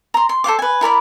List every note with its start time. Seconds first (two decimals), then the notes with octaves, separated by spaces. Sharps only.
0.14 A#5 C6
0.29 C6
0.44 A4 C5 F5 D6
0.59 B4 G#5
0.81 E4 A#4 D5 B5